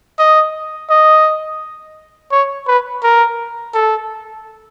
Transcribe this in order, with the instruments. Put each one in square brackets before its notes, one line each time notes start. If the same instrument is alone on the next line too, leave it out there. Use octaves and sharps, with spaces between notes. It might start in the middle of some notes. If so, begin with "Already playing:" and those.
[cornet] D#5
D#5
C#5
B4
A#4
A4